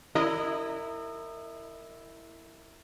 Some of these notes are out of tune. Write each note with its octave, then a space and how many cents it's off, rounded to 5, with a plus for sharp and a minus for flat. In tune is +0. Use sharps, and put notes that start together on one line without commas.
E4 +0 A#4 -25 D#5 -30